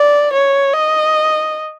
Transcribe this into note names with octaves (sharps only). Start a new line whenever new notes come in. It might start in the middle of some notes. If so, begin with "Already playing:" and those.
Already playing: D5
C#5
D#5